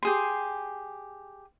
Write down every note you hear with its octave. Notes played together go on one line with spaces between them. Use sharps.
G4 G#4 C6